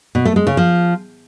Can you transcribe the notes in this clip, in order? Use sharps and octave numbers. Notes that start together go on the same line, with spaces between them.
B2
A3
G#3
C#3
F3